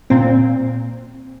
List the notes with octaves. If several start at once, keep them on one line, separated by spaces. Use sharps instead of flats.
A#2 C4